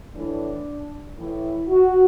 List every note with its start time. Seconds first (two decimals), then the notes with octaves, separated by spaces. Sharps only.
0.14 A2 E3 D4
1.17 A2 E3 E4
1.68 F#4